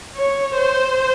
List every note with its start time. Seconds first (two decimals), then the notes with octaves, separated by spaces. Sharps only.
0.16 C#5
0.58 C5